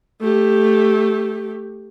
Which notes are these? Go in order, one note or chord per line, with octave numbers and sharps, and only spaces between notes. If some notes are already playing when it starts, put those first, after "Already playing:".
A3 G4